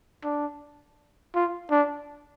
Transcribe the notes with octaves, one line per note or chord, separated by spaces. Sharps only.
D4
F4
D4